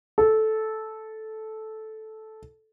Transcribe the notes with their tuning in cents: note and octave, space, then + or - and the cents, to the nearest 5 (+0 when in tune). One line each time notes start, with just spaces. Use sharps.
A4 -10